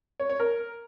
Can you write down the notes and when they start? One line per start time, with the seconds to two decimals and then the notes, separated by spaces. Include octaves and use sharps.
0.20 C#5
0.30 C#5
0.40 A#4